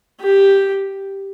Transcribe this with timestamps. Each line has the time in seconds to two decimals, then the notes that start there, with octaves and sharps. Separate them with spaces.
0.20 G4